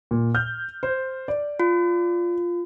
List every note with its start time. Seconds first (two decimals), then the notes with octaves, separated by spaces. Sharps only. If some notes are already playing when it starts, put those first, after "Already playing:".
0.11 A#2
0.35 F6 G6
0.83 C5
1.28 D5
1.60 F4